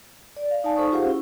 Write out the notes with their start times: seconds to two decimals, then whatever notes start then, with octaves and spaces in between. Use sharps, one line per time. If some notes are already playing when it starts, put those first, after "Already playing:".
0.36 D5
0.51 F5
0.64 D#4 D5 F5 G#5 A5
0.76 D#4 A4 C5 C#6 D#6
0.92 F4 G4 G#4 C5 F5 F#5
1.05 C#4 E4